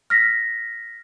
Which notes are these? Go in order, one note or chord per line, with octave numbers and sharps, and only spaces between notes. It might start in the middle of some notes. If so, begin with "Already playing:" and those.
F6 A#6 B6